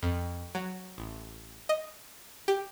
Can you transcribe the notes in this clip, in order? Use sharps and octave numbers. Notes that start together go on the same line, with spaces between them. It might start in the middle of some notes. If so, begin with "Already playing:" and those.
F2
F#3
A1
D#5
G4